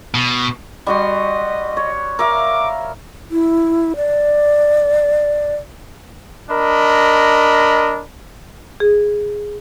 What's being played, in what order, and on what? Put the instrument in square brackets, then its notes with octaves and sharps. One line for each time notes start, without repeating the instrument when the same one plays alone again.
[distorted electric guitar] B2
[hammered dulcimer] G3 F#4 C6 [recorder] D#5
[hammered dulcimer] C#5
[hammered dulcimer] A#4 E5 F5 [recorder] D6
[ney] E4
D5
[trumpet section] D4 A#4 D#5 B5
[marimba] G#4